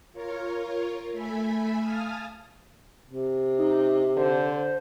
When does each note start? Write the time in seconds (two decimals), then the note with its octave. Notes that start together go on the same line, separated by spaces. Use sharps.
0.13 F4 A#4 C#5
1.11 A3 E5 G#5 B5
1.80 F5 G#5 A5 D#6 F6
3.07 C3
3.58 D#4
4.17 D3 C5